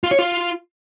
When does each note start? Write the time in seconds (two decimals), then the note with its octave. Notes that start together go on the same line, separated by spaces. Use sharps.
0.04 F4
0.11 C#5
0.19 F4